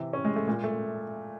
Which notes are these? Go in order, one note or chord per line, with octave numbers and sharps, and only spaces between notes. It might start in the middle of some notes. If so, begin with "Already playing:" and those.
Already playing: C3 E3
C#4
G#3
A3
A#2 G#3
A3